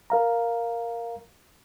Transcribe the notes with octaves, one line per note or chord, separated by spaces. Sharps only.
A#4 F5 A#5